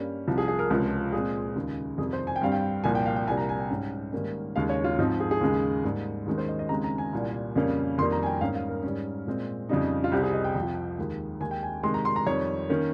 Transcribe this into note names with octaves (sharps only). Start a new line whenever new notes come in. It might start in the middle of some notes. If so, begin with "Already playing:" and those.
Already playing: G2 G3 A#3 C#4
C2 C3 F3
G#4
G#4
A#4
C#2 C3 F3 G#3 C#4
A#2 G#3 C4 G#4
D#2 C#3 G#3
F2 C3 D#3 G3 G#4
C5
G#5
G5
G2 G3 C4 F5
G5
C2 A#2 F3 A#3 G#5
G5
F5
G5
C2 C3 G3 A#3 G#5
A#5
G#5
G5
G#2 G3 C#4
G#2 D#3 G3 A#3 C#4
D#2 C#3 G#3 F5
C#5
F4
G#2 F3 C4 D#4
G#4
G#4
D#2 C#3 G#3
G#2 G3 A#3
D#2 D#3 G#3 C#4
C5
D#5
D#5
D#2 C#3 G#3 C4 A#5
A#5
G#5
C2 A#2 G3
F2 C#3 G3 A#3 C#4
F2 D#3 G3 A#3 C6
A#5
G#5
G5
G#2 G3 A#3 C#4 F5
F5
A#4
G#2 G3 C#4
A#2 G#3 C4
F2 C#3 G3 D#4
F4
C2 C3 G3 C4 G4
G#4
D#5
G5
F2 C3 F3
D#2 D#3 G#3
D#2 D#3 G#3 G#5
G5
G#5
C3 D#3 G#3 C6
A#5
C6
A#5
F2 D#3 G3 C#5
D#3 A#3 C#4